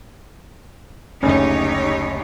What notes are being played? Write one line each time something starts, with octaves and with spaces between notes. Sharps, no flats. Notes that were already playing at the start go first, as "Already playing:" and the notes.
F#1 D2 C#4 D#4 G4 C#5